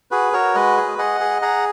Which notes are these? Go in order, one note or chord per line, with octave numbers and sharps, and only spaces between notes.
F#4 G#4 B4
F#4 A#4 C#5
G#3 B4 D#5
G#4
G#4 D#5 F#5
G#4
G#4 F#5 A#5